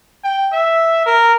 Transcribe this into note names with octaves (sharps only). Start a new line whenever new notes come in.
G5
E5
A#4